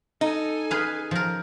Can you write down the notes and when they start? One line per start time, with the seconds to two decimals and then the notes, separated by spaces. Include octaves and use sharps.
0.21 D#4 A4 G#5
0.71 G#4 B4 F5
1.11 F3 A#4